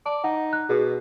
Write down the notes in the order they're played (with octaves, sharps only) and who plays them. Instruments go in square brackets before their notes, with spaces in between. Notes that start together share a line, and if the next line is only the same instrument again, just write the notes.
[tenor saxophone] D5 [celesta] A5
[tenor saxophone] D#4 [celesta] F#5
[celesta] F#6
[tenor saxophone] B2 [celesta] G#4